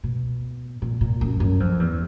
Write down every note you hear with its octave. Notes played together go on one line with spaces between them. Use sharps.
B2
A#2
A#2
F#2
F#2
F2
E2